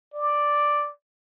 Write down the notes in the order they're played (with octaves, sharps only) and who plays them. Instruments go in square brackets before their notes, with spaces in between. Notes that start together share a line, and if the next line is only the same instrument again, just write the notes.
[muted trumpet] D5